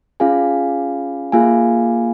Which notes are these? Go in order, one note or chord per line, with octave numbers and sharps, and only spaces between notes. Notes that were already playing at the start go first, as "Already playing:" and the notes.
C#4 F4 G#4 F5 G#5
A#3 F4 G#4 F5 G#5